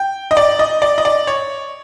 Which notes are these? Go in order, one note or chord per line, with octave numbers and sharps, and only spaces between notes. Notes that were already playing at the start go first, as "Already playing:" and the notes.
Already playing: G5
D#5
D5
D#5
D5
D#5
D5
C#5